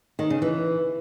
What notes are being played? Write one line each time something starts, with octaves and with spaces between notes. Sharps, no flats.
D#3
C#3
E3